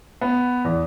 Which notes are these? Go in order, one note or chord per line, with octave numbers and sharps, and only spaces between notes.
B3
E2